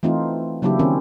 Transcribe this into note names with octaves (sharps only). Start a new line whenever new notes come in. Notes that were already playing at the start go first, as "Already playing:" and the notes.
E3 A3 C4 D#4 F4
C#3 F#3 A#3 D4 E4 G4
D#3 C4 C#4